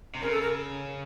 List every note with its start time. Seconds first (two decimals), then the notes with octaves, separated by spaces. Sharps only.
0.15 C3
0.22 C#3 A#4
0.32 A4
0.42 A#4